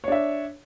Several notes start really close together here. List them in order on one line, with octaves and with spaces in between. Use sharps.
C#5 D4 E5